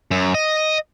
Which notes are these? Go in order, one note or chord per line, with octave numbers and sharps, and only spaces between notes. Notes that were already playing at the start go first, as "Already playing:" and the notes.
F#2
D#5